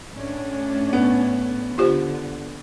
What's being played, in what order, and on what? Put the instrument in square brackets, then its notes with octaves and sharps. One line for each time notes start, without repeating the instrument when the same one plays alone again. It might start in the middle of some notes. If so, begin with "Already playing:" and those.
[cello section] A2 C#4 D4
[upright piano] B3
[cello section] D3 [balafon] F4 G4 C5